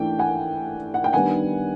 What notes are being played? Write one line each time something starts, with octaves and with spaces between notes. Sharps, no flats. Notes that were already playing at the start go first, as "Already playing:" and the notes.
Already playing: E3 A3 D4 G5
F#5 G#5
F#5
G5
D#3 G3 B3 D4 F#5 G#5